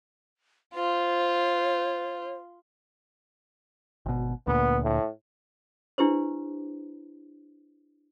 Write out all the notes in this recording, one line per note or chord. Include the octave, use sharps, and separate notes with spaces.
F4 C5
G#1 B2
D2 A#2 B3
A2
D4 E4 G4 B4 C5